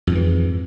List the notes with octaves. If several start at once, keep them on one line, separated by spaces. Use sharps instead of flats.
F2 G#2 E3